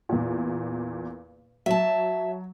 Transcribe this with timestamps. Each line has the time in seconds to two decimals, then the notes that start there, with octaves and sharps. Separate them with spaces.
0.09 E2 A#2
1.66 F#3 E5 A5